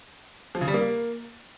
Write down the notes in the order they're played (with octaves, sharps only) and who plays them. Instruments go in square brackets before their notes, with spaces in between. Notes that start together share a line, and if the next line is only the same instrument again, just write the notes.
[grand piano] F3
C#3
G3
A#3